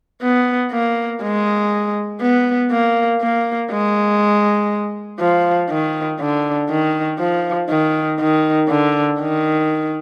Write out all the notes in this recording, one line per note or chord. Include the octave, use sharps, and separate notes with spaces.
B3
A#3
G#3
B3
A#3
A#3
G#3
F3
D#3
D3
D#3
F3
D#3
D#3
D3
D#3